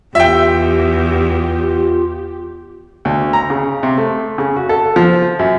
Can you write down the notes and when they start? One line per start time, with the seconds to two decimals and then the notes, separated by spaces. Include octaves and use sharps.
0.15 E2 F4 G4 E5 G5
3.05 D2
3.33 A#5
3.50 C#3
3.83 C3
3.97 A3
4.38 C#3
4.56 F#4
4.69 A4
4.96 F3
5.39 F#2